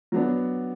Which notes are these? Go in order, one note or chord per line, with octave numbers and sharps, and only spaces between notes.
F#3 B3 D4